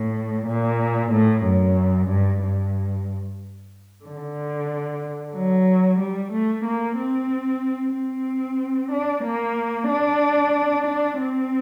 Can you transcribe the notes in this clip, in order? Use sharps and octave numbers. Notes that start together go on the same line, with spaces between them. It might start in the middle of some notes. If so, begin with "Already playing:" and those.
Already playing: A2
A#2
A2
F#2
G2
G2
D3
F#3
G3
A3
A#3
C4
C4
D4
A#3
D4
D4
C4